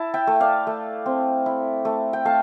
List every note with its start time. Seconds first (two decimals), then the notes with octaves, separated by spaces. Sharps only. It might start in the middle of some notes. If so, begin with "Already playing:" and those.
Already playing: E4 A5
0.14 E5 G5
0.27 A3
0.40 D5 F5
0.67 A3
1.06 C4
1.46 E4
1.85 A3
2.13 G5
2.25 A3 F5 A5